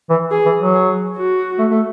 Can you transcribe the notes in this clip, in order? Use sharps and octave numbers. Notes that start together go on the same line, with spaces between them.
E3
G#4
E3
F#3
G#4
F#4
A3
A3